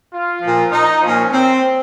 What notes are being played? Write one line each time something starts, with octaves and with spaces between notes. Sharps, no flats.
F4
A#2 F3
D#4
A#2 F3 C#4
C4